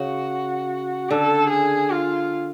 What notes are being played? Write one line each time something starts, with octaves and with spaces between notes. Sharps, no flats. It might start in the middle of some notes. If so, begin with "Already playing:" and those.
Already playing: C#3 F#4
D3 A4
G#4
F4